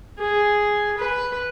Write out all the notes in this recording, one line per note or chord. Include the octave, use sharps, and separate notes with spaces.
G#4
B4